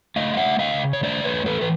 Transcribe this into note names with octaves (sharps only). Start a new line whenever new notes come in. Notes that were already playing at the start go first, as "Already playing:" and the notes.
A3 D#5 F5
F5
E5 F#5
A3
D#5 F5
C#3
C#5
A3 C5 D5
B4 C#5
E2
A4 B4
E3 B4